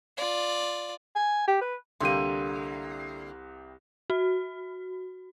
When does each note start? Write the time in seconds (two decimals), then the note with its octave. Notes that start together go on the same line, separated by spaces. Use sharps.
0.17 F4 D5
1.15 G#5
1.48 G4
1.61 B4
2.00 C2 D3 A#3 G4 C6 D#7
4.10 F#4